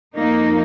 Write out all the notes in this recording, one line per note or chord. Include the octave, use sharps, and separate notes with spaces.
F2 F3 A#3 D#4